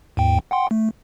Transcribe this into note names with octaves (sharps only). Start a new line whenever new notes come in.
D#2 G#2 G5
F#5 G5 C6
A3